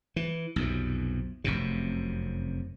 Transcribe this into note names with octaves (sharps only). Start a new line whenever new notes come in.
E3
B1 F2 C3
F1 F#2 C3